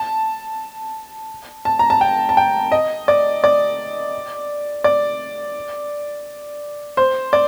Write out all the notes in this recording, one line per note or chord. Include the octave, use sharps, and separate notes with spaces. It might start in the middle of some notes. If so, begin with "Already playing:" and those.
Already playing: A5
A5
A#5
A5
G5
A5
G5
D#5
D5
D5
D5
C5
D5